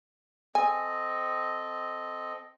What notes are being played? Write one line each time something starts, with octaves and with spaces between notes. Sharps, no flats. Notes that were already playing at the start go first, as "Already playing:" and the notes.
C4 A4 D#5 G#5